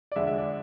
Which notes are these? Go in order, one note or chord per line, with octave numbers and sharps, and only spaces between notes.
D5
F2 D3 G#3 E5
E5
D5